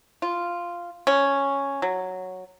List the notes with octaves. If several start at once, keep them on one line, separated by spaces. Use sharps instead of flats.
F4
C#4
F#3